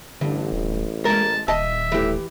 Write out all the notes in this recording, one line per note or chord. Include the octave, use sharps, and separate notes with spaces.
A1 G2 D3
D1
G#3 A#3 A#4 A5
D#1 D#5 E5 A5
A2 E3 G4